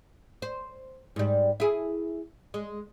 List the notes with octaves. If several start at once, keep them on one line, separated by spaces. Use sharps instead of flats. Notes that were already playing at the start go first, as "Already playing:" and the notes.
C5
G#2 G3
E4 G#4
G#3